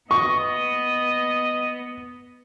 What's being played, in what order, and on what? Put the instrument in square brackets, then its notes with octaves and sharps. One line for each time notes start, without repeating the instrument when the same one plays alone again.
[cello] B3 [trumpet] D#5 [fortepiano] C#6